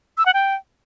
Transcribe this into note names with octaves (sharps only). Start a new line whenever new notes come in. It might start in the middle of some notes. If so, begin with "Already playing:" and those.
E6
F#5
G5